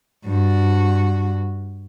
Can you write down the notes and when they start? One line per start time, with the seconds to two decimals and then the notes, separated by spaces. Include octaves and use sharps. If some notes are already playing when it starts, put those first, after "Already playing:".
0.25 G2 F#4